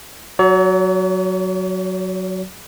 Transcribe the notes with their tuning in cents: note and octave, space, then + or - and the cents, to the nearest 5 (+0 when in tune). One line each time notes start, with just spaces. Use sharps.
F#3 +0 C#5 +45